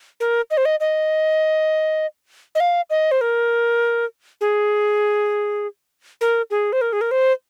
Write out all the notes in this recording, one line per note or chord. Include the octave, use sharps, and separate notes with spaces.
A#4
D#5
C5
D#5
D#5
D#5
F5
D#5
C5
A#4
G#4
A#4
G#4
C5
A#4
G#4
A#4
C5